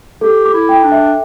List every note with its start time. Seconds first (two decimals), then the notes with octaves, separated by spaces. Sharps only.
0.21 G4 A4
0.46 D6
0.53 E4
0.69 G5
0.83 D4
0.92 E5